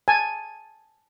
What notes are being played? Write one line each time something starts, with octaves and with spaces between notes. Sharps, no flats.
G#5 A5